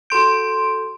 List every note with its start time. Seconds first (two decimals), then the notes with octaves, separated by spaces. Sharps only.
0.10 F#4 A4 C6 G6 D7